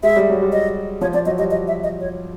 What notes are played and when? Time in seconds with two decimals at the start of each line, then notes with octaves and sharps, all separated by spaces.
0.03 G#3 E5
0.16 G3
0.30 F#3
0.42 G3
0.52 D#5
1.01 F3 C#5
1.14 F3 D5
1.26 F#3 D#5
1.38 G3 D#5
1.51 D#5
1.67 E5
1.83 D#5
2.00 C#5